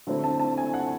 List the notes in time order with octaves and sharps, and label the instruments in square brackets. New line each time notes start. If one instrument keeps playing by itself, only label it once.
[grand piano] D3 F#3 A3 C4 E4
[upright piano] A5
A5
G#5
F#5